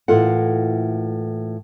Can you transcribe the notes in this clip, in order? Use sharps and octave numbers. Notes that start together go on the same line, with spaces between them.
A2 E3 A#3 F4 A4 F#5